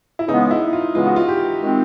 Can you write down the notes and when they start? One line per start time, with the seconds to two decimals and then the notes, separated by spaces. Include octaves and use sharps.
0.19 E4
0.28 C#3 E3 G#3 B3 D#4
0.51 E4
0.73 F4
0.94 C#3 E3 G#3 B3 F4
1.06 F#4
1.16 F4
1.28 G4
1.62 D#3 G#3 C4